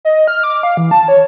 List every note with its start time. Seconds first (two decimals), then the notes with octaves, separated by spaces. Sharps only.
0.05 D#5
0.28 F6
0.44 D6
0.63 F5
0.77 E3
0.91 A5
1.08 C#5